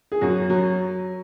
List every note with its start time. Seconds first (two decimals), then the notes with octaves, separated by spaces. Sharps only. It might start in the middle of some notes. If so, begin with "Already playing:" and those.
0.12 G#4
0.21 F#2 F#4
0.50 F#3